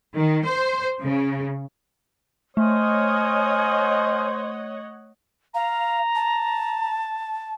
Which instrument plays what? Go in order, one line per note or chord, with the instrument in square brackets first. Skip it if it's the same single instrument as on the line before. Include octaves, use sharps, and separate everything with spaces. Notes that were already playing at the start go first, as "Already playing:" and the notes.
[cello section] D#3
C5
C#3
[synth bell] A3 [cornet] C5 [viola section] C#5 D#5 F#5 [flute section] G#5 D#6 F6
[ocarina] F5 [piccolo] A#5
[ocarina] A5